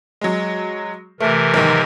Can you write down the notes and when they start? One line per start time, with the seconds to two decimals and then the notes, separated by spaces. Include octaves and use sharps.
0.21 F#3 G#3
1.20 C3 E3 A3 A#4
1.54 B1 G#2 D#3